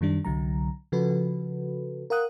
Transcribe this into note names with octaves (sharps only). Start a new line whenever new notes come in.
F#2 D#3 G3 D4
C2 D3 F#3 A#5
C#3 F3 F#4 A4 B4
A#4 F5 F#5 D#6 F#6